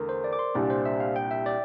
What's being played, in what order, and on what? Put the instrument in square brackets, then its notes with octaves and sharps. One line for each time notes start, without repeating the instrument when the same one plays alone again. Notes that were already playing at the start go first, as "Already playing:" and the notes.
Already playing: [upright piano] E2 D3 A3 [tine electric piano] A#4
[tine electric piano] C5
D5
D6
C6
[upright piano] C2 A#2 G3 D4 [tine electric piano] D5
[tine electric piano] C5
E5
F5
G5
E5
D5